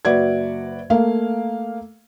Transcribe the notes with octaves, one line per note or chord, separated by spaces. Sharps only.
F#1 F#4 B4 D5 E5 G#6
A3 A#3 F5